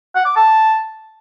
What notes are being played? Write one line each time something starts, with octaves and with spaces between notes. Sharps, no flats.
F#5
D6
A5